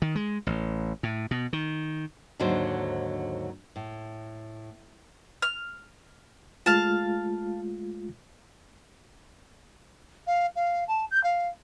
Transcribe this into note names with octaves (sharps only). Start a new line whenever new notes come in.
D#3
G#3
A1
A2
B2
D#3
D#2 G#2 D3 F#3 C5
A2
F6
G#3 A3 F4 F5 A5
F5
F5
A5
G6
F5